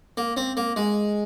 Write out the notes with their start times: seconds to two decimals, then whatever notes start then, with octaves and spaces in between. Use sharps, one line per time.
0.17 A#3
0.37 C4
0.57 A#3
0.76 G#3